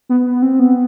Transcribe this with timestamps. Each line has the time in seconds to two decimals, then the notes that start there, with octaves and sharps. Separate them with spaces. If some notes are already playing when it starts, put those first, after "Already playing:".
0.09 B3
0.26 B3
0.42 C4
0.59 B3